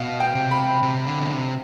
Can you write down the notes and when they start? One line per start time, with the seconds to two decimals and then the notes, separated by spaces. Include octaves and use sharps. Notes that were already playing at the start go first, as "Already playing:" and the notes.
Already playing: B2 F5
0.20 G5
0.35 C3
0.51 B5
0.83 C3
1.06 D3
1.19 B2
1.30 C3